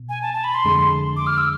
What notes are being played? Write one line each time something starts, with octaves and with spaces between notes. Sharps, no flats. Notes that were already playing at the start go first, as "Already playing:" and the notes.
Already playing: B2
G#5
A5
A5
B5
C6
F2 D3 G#3
D6
F6
E6